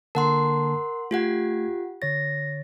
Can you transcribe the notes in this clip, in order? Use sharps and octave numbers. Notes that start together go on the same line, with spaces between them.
D3 A#3 A#4 F#5 A5 C6
A3 F4 G4 F#5 G#6
D3 C#5 A6 A#6